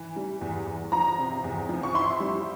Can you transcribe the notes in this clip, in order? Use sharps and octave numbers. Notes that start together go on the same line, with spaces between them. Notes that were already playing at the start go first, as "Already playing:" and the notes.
Already playing: E3
G3
E2
E2
F3 A#5
C3
E2
F3
C#6
E4 C6
G3